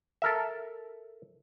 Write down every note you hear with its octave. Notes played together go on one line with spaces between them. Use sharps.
A4 A#4 E5